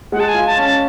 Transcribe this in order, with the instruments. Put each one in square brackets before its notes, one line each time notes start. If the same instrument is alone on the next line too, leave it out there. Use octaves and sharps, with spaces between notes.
[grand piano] G#3 [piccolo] F#5
[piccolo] A5
G#5
[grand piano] F4
[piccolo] A5
[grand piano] C#4
[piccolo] A5